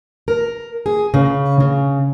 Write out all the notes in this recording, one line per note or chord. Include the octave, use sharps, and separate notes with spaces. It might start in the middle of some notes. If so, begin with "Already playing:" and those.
A#4
G#4
C#3
C#3